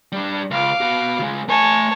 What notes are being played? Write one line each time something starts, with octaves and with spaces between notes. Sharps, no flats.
G3 D4
C#2 F5 D6
B3 F#4
C#3 G#3
A3 C#5 G#5 A5